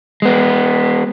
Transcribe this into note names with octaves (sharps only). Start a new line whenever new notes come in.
G#3 B3